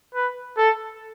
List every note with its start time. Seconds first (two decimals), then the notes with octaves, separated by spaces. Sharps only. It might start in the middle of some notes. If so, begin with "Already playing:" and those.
0.15 B4
0.57 A4